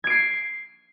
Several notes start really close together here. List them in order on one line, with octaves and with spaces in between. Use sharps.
G#6 D7 C7